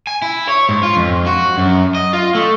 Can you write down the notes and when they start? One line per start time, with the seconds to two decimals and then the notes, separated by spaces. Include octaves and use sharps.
0.07 G#5
0.22 E4
0.49 C#5
0.69 G#2
0.83 F4
0.97 F2
1.26 F#4
1.57 F#2
1.95 D#5
2.13 F4
2.35 A3